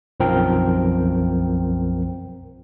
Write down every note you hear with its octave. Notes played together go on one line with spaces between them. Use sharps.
B1 F#2 F3 C4 A#4 G5